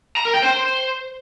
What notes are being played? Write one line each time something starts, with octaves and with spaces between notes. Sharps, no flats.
A#5
A#4
G5
C5